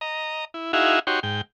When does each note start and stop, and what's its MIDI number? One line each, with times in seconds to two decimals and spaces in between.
0.01 0.45 75
0.01 0.45 82
0.54 0.72 64
0.73 0.99 63
0.73 0.99 64
0.73 0.99 66
0.73 0.99 68
0.73 0.99 76
0.73 0.99 77
1.07 1.20 63
1.07 1.20 66
1.07 1.20 67
1.07 1.20 73
1.07 1.20 84
1.23 1.41 44
1.23 1.41 79